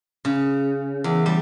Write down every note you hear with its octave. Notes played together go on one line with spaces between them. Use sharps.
C#3
E2
G3